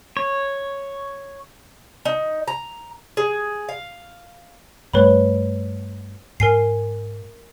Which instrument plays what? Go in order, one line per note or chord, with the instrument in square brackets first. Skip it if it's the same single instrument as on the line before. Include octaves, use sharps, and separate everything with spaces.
[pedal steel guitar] C#5
[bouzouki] D#4
A#5
G#4
F5
[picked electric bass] G2 G3 A3 [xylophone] B4 C#5 B5
[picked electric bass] G#2 [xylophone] A#4 G#5 C7